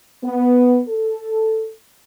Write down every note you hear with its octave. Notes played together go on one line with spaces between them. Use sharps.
B3
A4